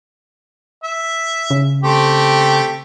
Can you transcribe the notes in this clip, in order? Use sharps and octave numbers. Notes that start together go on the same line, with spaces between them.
E5
C#3
A3 C4 G4